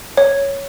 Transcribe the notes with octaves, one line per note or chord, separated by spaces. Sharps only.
C#5